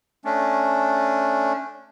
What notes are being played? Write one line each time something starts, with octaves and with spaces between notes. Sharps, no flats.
A3 C#4 D4